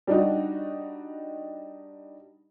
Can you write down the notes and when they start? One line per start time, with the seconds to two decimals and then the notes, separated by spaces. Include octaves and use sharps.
0.07 G3 D4 D#4 F#4